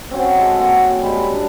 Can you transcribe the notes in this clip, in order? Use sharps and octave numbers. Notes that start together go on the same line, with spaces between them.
C4 C#4 F#4
G#3 A4
A#3 A4 F#5
G3 G#3 B5
D4